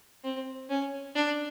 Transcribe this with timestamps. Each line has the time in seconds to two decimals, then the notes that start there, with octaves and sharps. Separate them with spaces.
0.24 C4
0.69 C#4
1.15 D4